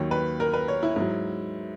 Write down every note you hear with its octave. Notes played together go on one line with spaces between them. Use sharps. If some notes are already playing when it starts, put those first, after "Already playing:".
Already playing: D#2 D#3 F#3 C#5
B4
A#4
B4
C#5
E4
G#2 F#3